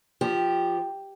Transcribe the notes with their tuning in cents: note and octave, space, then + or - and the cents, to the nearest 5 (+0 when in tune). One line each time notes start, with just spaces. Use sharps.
F3 +0 G4 +0